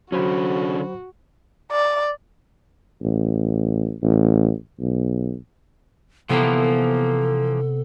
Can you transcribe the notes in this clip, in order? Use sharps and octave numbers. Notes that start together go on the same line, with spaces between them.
D3 F#3 C#4 F#4 C5 B5
D5
A1
A1
B1
C3 E3 F3 A#3 B3 A4